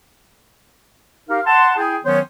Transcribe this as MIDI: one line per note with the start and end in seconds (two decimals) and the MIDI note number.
1.29 1.39 63
1.29 1.39 67
1.29 1.39 70
1.29 1.39 77
1.45 1.76 78
1.45 1.76 81
1.45 1.76 84
1.77 1.96 64
1.77 1.96 68
1.77 1.96 79
2.04 2.19 51
2.04 2.19 54
2.04 2.19 59
2.04 2.19 61
2.04 2.19 72
2.04 2.19 73